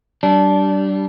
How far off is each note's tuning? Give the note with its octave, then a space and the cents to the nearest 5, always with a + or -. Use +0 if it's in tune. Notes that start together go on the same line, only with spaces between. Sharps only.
G3 -30 D4 -10